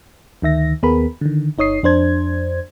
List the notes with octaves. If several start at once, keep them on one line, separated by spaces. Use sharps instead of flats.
D2 D#3 E5 A#6
D#2 B3 G#4 A#4 B5
D3 D#3
G1 D#4 C#5 D#6 C7
F2 D4 C5 G#6